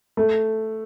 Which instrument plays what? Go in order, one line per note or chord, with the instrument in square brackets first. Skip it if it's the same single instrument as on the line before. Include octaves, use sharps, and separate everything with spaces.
[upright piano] A3